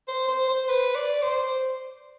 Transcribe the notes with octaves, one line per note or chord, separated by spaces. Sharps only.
C5
C5
C5
B4
D5
C5